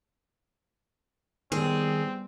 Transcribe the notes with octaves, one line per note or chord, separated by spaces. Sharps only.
D#3 G3 B3 C4 G#4